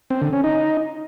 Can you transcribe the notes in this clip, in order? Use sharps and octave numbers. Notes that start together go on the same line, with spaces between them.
C4
D3
C#4
D#4